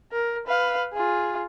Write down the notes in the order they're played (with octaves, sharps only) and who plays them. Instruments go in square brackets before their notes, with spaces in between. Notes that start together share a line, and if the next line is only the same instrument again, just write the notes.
[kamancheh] A#4
B4 F5
F4 G#4